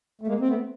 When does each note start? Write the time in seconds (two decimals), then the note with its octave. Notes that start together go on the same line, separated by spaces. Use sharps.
0.21 A3
0.27 G#3 A#3
0.40 C4
0.48 A3 B3